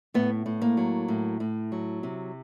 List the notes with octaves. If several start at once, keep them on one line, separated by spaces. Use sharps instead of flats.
A2 B3
A2
A#3
F#3
A2
A2
F#3
C3